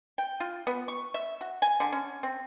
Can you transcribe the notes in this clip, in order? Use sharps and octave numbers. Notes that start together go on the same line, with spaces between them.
G5
F4
B3
C#6
E5
F#4
G#5
D3
C#4
C4